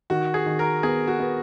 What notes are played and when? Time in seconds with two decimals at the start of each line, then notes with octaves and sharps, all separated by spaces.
0.10 D#3 F#4
0.34 G#4
0.46 D#3
0.59 A#4
0.83 B3 G#4
1.07 F#4
1.20 B3